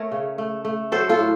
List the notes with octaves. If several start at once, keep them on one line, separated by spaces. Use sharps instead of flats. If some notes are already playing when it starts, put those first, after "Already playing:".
Already playing: A3 A#4 C#5
C#3
A3
A3
F#3 A4 C5
F4 A4
A2